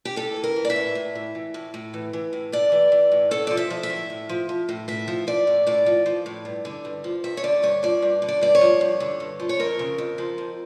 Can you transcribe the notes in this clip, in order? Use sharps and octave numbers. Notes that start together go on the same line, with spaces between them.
G4
A2 A4
E3
A#4
E3
D5
E5
A2
A2
E3
E3
A2
A2
E3
E3
A2
A2 D5
E3
E3
A2
A2 A4
F3 D5
E5
F3
E5
A2
A2
F3
F3
A2
A2 E5
F3
F3 D5
A2
A2 D5
F3
F3
A2
G2
D3
G2
F3
G2 E5
C#5
D3 D5
G2 C#5
F3 D5
G2
D3
D5
G2 D5
C#5
F3
G2
D3
G2
F3
C#5
F2 A#4
C#3
F2
F3
F2